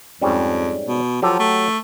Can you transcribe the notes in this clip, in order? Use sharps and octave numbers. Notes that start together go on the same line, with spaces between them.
F2 G#2 G3 C#4
B2
F3 F#3 G4 A4
A3